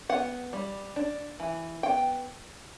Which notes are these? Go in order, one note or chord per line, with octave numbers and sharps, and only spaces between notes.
B3 F#5
G3
D4
E3
B3 G5